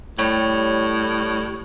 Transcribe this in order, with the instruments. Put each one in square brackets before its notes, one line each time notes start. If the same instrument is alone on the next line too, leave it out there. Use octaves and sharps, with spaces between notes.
[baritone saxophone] A2 [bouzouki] G3 C#5